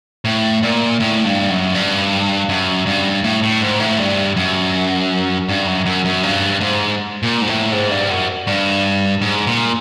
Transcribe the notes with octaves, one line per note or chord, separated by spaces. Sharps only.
A2
A#2
A2
G2
F#2
G2
F#2
G2
A2
A2
G#2
A2
G2
F#2
G2
F#2
F#2
F#2
G2
G#2
A#2
G#2
A2
G#2
G2
F#2
G2
G#2
A#2